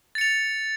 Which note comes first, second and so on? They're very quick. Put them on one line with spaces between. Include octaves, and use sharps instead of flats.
A6 C#7 F7